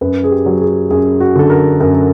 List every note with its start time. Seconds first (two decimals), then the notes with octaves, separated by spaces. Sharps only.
0.01 F#2 B4
0.24 G#4
0.31 G4
0.46 F#3
0.61 G#4
0.91 F#2 G#4
1.20 F#4
1.36 D3 A4
1.50 A#4
1.80 F#2 A#4